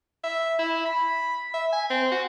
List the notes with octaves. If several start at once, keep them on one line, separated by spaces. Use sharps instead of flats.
E5
E4
B5
E5
G#5
C4
F#4